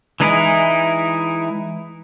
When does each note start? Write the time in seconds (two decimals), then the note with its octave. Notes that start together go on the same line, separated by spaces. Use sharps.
0.20 E3 G#3 D#4 E4